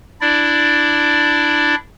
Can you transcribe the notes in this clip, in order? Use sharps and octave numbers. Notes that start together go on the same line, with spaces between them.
D4 E4 D5